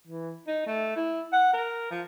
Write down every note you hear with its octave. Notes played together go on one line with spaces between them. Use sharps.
E3
D#4
A3
E4
F#5
A#4
F3